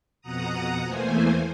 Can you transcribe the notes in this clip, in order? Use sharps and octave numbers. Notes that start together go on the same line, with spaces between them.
F2 B2 F#5 A#5 D#6
E2 E3 A3 A#3 C5 G#5